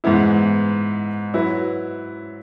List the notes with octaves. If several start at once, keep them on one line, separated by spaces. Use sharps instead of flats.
G#2 E3 B3 E4
F#3 E4 B4